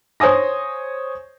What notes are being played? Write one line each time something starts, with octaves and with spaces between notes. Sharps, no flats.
C5 C#5 G#5 D#6 A#6